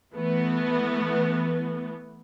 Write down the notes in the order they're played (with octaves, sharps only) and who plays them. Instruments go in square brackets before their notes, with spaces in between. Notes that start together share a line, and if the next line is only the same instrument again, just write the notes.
[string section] E3 A3 B3